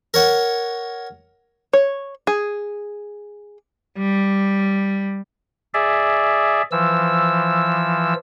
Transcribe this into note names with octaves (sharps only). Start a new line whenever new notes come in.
A#4 C#5 F#5
C#5
G#4
G3
G#4 D5 E5
E3 F3 E6